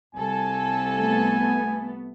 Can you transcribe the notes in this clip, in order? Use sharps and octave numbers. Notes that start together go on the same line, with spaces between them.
C2 A4 G#5
A3 B3